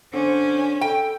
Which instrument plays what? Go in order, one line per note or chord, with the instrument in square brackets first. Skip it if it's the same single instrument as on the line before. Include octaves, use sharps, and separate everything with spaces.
[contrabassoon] D3 [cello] C#4 [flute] C5
[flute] A4 [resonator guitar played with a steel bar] G5